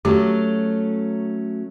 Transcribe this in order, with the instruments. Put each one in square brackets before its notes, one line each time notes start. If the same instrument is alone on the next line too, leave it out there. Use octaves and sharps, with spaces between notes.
[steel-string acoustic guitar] F#3 A3 C#4 [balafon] G4